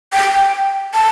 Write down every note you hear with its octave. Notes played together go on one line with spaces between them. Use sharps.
G5
A5